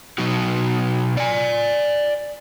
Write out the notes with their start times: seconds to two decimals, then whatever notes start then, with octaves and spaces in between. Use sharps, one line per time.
0.18 B2 F#3 D#4 F#4
1.17 D5 G#5